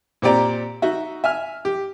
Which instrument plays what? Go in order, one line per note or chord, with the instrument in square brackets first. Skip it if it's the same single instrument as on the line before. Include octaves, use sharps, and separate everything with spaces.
[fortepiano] A#2 C4 G4 D5 A#5
D#4 F#4 E5
E5 G#5 F6
G4